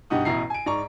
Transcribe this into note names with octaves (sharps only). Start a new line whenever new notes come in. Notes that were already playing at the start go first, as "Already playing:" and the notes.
G2 B2 D#4 G4 F#5 D#6
A1 B2 E4 A#5 C7
G#5 D7
G#2 D5 A#5 C#6